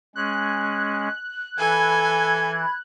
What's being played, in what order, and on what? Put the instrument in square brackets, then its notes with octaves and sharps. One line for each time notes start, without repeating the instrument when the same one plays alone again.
[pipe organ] G#3 C#4 [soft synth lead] F#6
[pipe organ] E3 [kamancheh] A4 G#5 [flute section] B5 G#6